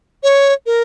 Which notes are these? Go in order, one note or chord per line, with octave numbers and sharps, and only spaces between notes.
C#5
A#4